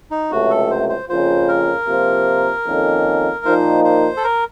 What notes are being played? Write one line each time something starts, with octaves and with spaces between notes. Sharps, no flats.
D#4
C#2 C3 F#3 A3 F#4
A4
C5
C5
F2 C#3 F3 A#3 F4 C5
A#4
C3 F3 A#3 F4 C5
F2 D#3 A#3 C#4 A4
A#2 F3 A#3 D#4 C5
C5
A4
A#4